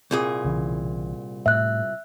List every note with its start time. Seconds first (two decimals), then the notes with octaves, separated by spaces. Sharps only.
0.11 C2 A#2 G#4
0.44 B1 C#3 E3
1.46 A2 E5 F#6